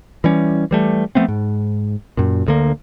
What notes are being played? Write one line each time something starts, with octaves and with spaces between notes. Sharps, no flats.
E3 G3 C#4
E3 G3 A3
F3 A3 B3 C4
G#2
F#2 A#2
D2 D3 A#3